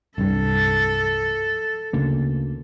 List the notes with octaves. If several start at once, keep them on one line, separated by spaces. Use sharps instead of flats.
C2 G2 A4
D2 C#3 A#3